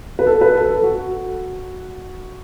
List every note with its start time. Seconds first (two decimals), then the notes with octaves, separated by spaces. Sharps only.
0.19 B4
0.26 A4
0.41 B4
0.56 A4
0.69 A4
0.83 F#4